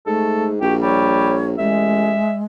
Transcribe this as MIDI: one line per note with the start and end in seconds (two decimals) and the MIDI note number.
0.06 0.56 44
0.06 0.52 57
0.06 0.46 69
0.61 1.54 34
0.61 0.76 66
0.61 0.74 67
0.82 1.39 55
0.82 1.45 73
1.58 2.17 33
1.58 2.42 56
1.58 2.35 76